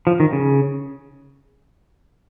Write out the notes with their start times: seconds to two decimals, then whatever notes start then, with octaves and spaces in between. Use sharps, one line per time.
0.07 F3
0.20 D#3
0.33 C#3